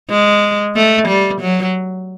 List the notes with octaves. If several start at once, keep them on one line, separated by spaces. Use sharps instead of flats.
G#3
A3
G3
F#3